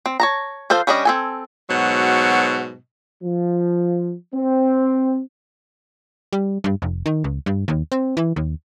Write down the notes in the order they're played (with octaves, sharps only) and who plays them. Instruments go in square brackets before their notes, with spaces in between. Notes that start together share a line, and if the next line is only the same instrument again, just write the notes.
[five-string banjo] C4
C#5 A5 A#5
F3 A4 C5 F5
G3 C#4 D4 D5 D#5
C4 A4 G#5
[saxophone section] G#2 B2 F#3
[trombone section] F3
C4
[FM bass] G3
G2
F1
D#3
C#2
G2
D#2
C4
E3
D#2